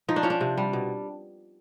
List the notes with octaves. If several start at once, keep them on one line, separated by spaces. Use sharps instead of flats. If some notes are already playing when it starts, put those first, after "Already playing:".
F3 D#4
D4
F3 C#4
D4
C3
G3
B2